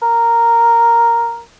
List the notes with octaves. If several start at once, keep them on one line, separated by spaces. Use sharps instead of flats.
A#4